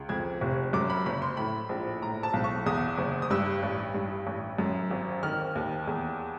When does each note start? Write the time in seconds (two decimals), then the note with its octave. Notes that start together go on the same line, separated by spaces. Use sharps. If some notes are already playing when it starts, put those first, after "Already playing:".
Already playing: C#2
0.09 F2 G#6
0.41 F1
0.73 F#2 D6
0.90 B5
1.06 F#1 B5
1.22 C6
1.37 A2 B5
1.69 A#1
2.02 A2 A#5
2.23 A5
2.33 B1
2.44 C#6
2.66 E2 D#6
2.98 F#1
3.22 D#6
3.30 G2 E6
3.63 A1
3.94 G2
4.27 A1
4.58 F#2
4.90 G#1
5.23 D#3 F6
5.55 D#2
5.87 E2